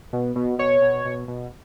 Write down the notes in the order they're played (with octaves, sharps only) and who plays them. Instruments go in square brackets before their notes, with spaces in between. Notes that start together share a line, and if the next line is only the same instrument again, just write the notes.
[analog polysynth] B2
B2
B2 C#5
B2
B2
B2